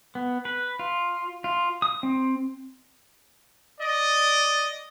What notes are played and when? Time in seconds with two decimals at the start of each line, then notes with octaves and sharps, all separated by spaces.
0.15 B3
0.45 B4
0.79 F4
1.44 F4
1.82 D#6
2.03 C4
3.79 D5 D#5